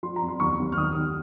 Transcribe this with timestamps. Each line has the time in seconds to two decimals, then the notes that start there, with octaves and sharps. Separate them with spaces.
0.03 F3 C6
0.16 A#5
0.22 F2
0.28 C6
0.40 D#2 C#6
0.59 D#2
0.72 F6
0.77 D#3 D#6
0.96 D#3